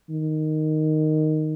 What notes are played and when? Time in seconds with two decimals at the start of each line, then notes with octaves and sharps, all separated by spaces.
0.09 D#3